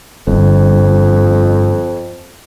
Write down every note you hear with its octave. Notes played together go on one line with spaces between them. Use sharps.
G1 F2